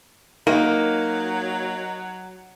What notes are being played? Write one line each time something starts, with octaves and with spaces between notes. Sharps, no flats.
F#3 A#3 D#4